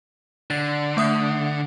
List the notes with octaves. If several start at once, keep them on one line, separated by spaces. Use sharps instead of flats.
D3 A6
A3 E5 D#6